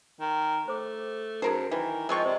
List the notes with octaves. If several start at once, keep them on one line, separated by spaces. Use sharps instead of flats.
D#3
A3 C5 D6
F#2 D#4 G#4 A#4 C5
D#3 E3
F3 G#3 C4 A#4 D#5 C#6
C3 C5 D5 C6